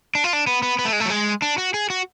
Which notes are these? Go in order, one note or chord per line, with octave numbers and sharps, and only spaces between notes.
D4
F4
D4
B3
B3
B3
A3
G#3
A3
F#3
G#3
D4
F#4
G#4
F#4